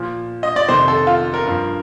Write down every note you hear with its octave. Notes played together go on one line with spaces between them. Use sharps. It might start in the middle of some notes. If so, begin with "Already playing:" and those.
Already playing: A#2 F3
D#5
D5
F2 C3 D#3 C5
A4
F4
A#4
G2 F3